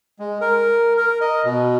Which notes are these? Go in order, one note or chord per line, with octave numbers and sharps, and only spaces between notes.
G#3
A#4
A#4
D#5
B2